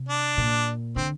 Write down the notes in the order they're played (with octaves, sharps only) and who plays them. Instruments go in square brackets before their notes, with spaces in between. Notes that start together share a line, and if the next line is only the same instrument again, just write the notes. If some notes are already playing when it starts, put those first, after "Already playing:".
Already playing: [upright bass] C3
[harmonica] D4
[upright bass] A#2
[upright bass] D3 [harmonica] C4